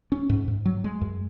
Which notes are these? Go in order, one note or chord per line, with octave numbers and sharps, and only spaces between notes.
C#4
G#2
G#2
F#3
G#3
F#2